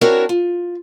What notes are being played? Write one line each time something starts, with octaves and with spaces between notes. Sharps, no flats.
C4 D4 E4 F#4 A#4 C#5
F4